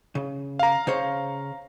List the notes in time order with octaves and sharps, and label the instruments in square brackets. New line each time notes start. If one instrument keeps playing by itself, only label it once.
[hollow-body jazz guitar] C#3
[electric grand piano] F5 A#5
[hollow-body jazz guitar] C#3 C5 C#5